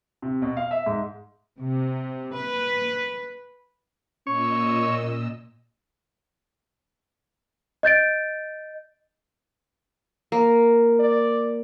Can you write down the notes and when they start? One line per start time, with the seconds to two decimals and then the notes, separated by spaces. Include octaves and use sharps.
0.22 C3
0.42 B2
0.57 F5
0.71 E5
0.86 G#2
1.59 C3
2.34 B4
4.27 A#2 C#4 C#5 D#5 E6
7.83 D#5 G6 A6 D7
10.32 A#3
11.00 D5